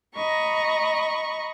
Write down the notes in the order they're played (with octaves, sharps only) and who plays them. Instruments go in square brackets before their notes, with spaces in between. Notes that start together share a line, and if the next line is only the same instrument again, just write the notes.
[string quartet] D#5 A#5 B5 C#6